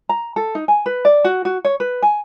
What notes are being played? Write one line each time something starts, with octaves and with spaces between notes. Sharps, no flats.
A#5
A4
D#4
G#5
B4
D5
F#4
F#4
C#5
B4
G#5